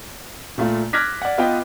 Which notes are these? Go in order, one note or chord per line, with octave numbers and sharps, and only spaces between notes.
A#2 A3 F4
D6 F6 F#6 G#6 A#6 B6
D5 F#5
B3 F4 B4 D#5 G5